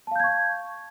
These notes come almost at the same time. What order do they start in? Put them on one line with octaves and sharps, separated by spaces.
A5 F5 G6 G#6 C#6